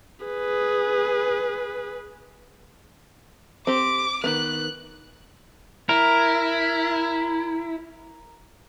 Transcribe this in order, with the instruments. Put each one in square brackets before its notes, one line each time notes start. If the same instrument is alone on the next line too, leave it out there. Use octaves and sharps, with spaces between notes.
[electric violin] G#4 B4
[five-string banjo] C4 G4 [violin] D6
[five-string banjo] D#3 B3 [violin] F#6
[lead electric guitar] E4 [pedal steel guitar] A#4